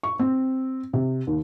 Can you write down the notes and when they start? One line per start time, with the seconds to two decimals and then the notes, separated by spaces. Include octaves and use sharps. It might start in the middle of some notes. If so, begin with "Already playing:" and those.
0.03 C#6
0.19 C4
0.93 C3
1.27 D#2